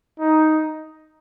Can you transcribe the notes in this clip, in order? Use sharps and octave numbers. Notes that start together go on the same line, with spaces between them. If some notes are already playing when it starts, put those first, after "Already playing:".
D#4